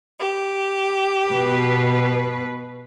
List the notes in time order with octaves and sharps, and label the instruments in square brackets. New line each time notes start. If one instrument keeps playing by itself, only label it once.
[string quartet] G4
[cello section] B2 B4